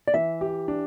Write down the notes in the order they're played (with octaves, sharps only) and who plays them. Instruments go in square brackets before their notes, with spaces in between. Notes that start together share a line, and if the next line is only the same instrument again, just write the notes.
[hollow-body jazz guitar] D5
[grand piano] E3 [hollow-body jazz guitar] E5
[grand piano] G4
D4